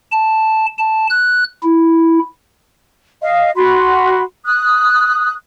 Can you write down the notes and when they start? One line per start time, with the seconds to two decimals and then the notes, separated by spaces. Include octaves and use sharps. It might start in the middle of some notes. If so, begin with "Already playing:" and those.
0.11 A5
0.78 A5
1.09 F#6
1.63 E4
3.21 D#5 F5
3.57 F#4 B5 C6
4.46 D#6 F#6